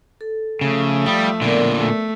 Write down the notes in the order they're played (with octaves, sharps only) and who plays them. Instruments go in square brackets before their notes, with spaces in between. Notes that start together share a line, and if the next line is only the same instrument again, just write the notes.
[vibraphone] A4
[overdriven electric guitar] C#3 [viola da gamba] F3 A3
[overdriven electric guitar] G3 [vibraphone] F5 B5 D#6
[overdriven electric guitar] A#2 D3 [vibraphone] B3 A#4 D5
[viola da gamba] A3